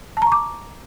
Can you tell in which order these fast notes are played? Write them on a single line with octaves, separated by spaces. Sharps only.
A5 A#5 C#6 D6